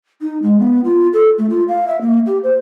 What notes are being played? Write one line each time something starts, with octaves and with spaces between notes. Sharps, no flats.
D#4
G#3
B3
F4
A4
A3
F4
F5
E5
A#3
G4
C5